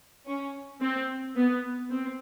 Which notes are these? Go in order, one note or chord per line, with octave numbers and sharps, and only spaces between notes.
C#4
C4
B3
C4